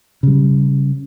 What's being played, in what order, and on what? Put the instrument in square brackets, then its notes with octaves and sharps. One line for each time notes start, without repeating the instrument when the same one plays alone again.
[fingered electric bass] C#3 G3